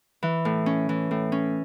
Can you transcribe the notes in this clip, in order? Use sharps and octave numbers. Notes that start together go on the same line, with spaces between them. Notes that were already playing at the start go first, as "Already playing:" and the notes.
E3
A2
C#4
E3
A2
C#4